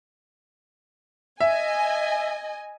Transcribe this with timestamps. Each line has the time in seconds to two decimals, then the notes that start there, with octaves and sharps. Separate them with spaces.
1.40 D#5 E5 G#5